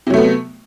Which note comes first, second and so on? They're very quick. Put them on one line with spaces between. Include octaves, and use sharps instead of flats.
C3 F#3 A3 B3